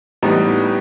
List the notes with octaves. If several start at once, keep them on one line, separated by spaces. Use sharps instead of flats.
A2 E3 G3 B3 D#4